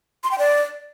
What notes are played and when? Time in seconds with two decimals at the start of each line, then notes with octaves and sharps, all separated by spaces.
0.24 C6
0.31 G5
0.39 D5